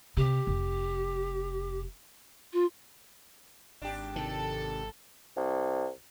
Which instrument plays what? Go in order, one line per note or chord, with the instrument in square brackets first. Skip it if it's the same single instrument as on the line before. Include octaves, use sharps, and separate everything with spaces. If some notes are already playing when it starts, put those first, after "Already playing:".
[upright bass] C3 [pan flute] G4
[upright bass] F1
[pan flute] F4
[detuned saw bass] G#1 [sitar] D4 G4
[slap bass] C3 D#3 [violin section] A4
[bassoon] C2